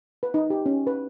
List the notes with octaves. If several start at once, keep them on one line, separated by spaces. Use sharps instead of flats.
B4
D#4
G4
C#4
B4